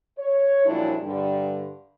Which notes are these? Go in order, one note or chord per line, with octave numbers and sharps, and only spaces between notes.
C#5
F#2 A#2 F3 G3 D4 E4
G2 D3 G3